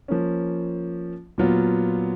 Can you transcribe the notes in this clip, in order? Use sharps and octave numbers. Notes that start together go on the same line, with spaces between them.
F3 A#3 C#4
A#2 F#3 B3 F4